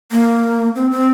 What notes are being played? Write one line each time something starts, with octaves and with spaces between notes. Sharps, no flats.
A#3
C4
C4